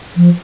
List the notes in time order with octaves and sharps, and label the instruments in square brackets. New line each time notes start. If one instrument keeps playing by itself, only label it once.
[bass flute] F3